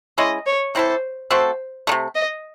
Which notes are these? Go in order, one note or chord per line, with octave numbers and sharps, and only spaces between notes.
G#3 C#4 E4 D#5
C#5
E3 C4 E4 A4 C5
A3 C4 F#4 A4 C5
C3 D#3 A3
D#5